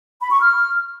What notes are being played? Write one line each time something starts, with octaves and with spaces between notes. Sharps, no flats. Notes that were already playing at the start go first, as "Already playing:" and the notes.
B5
C#6
F6